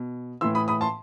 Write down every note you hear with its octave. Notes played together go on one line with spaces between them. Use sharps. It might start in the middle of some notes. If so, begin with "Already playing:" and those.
Already playing: B2
A2 E3 C6 E6
B5 D#6
B5 D#6
A5 C6